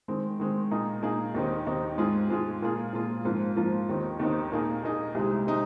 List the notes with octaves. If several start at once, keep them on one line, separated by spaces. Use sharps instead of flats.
D#3 G#3 C4
D#3 G#3 C4
A#2 A#3 D#4 G#4
A#2 A#3 D#4 G#4
D#2 D#3 C4 D#4
D#2 D#3 C4 D#4
G#2 G#3 F4 G#4
G#2 G#3 F4 G#4
A#2 A#3 F4 G#4
A#2 A#3 F4 G#4
G#2 F3 A#3 F4
G#2 F3 A#3 F4
D#2 D#3 C4 D#4
D#2 D#3 C4 D#4
A#2 A#3 D#4 G#4
A#2 A#3 D#4 G#4
C2 C3 G#3 D#4
C3 G#3 D#4